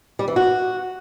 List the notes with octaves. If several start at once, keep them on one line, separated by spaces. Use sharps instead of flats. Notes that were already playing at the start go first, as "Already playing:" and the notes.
G3
E3
F#4